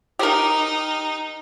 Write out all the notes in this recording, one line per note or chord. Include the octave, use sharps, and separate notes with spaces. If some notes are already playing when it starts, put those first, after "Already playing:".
D#4 G4 A#4